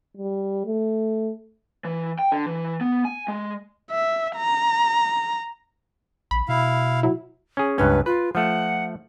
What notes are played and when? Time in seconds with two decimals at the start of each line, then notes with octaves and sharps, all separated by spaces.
0.17 G3
0.66 A3
1.85 E3
2.19 G5
2.32 D3
2.46 E3
2.81 B3
3.05 G#5
3.28 G#3
3.91 E5
4.36 A#5
6.31 A#1 B5
6.49 B2 E4 F5
7.03 F#3 E4
7.57 C#4 G#4
7.78 C#2 G2 C#4 B4
8.06 F4 B4
8.35 F3 A3 F#5